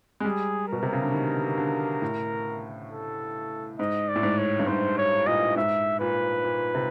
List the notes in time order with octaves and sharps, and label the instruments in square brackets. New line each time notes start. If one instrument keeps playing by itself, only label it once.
[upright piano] G#3
[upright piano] G3 [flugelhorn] G#4
[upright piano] B2 [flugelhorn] A#4
[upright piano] C3
C#3
D3
D#3
D3
A2
[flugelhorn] A4
[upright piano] G#2 [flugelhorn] D#5
[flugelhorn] D5
[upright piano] A2
G#2
[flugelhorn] C#5
[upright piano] G2
[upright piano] G#2 [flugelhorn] C5
[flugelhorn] C#5
[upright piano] A#2 [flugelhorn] D#5
[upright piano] G#2 [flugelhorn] E5
[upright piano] A#2 [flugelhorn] B4
[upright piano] A#2
C3